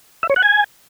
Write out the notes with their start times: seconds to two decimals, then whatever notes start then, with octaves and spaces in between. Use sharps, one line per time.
0.23 E5
0.30 C#5
0.36 F#5
0.43 G#5